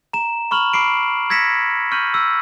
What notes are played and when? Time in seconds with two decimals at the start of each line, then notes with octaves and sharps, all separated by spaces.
0.13 A#5 E7
0.51 B5 C#6 F6 F7 F#7
0.73 B5 D6 C7 D7
1.30 E6 G#6 A#6 B6 C#7 E7
1.91 C#6 F6 G6 D#7 F#7
2.14 E6